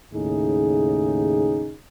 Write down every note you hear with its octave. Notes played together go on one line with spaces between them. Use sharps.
D#2 A2 C#3 D#4 G#4